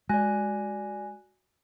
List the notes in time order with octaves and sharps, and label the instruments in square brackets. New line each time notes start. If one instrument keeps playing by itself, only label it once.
[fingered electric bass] G#3 [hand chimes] F#4 D5 [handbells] G#5 F#6 A#6